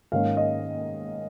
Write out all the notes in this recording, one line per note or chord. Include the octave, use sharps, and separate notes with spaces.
G#2 D#3 A#3 C#4 F5
D#5